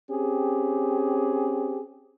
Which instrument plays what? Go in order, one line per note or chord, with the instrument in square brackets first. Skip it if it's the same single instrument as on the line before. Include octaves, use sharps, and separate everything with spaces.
[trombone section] C4 C#4 G4 G#4